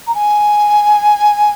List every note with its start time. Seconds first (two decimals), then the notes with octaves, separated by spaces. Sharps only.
0.06 A#5
0.14 G#5